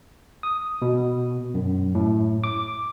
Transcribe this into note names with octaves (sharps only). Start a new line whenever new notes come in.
D#6
B2
F#2
A2
D6